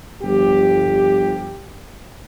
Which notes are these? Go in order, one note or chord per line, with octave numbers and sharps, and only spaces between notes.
G1 F3 G4